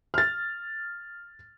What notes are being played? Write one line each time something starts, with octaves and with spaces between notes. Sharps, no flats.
F6 A6